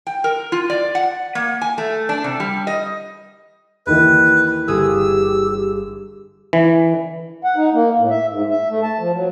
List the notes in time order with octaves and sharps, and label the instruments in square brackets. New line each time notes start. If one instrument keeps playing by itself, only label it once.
[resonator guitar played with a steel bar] G5
A#4
F4
D5
F#5
A#3
G#5
A3
D4
C3
G3
D#5
[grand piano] D#2 D#3 E3 [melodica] B4
[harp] G1 G#4 D#6 [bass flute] G4 [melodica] E6
[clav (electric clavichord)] E3
[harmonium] F#5
D#4
A#3
A2
E5
G#2
E5
A3
A5
F3
F#3